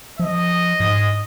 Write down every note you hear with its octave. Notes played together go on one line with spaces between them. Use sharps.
F3 D#5
G#2